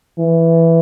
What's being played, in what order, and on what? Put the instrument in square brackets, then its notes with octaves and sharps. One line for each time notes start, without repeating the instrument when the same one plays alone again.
[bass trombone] E3